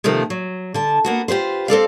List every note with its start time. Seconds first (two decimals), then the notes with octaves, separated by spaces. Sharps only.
0.04 C3 D#3 F3 A3 A#3
0.30 F#3
0.74 D3 A5
1.05 A#3 B3 F#4
1.28 F4 G4 B4 C5
1.68 C4 A4 D5 F5